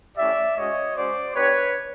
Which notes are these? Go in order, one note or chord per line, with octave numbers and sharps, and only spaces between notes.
A3 C#4 E4 G4 D5 E5
G#3 C#4 F#4 C#5 D#5
G#3 C#4 F#4 C5 D5
B3 D4 G4 B4 C#5